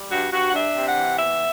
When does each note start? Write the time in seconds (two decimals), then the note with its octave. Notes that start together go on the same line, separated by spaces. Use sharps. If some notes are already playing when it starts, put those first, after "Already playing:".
Already playing: G3
0.10 G2 F#4
0.31 G2 F#4
0.49 F#5
0.53 D4 E5
0.75 C3
0.86 F#5
0.96 E3
1.18 B3 E5